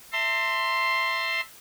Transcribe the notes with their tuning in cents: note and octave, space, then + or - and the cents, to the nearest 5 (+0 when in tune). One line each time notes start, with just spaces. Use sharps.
E5 +0 A5 +40 C6 +0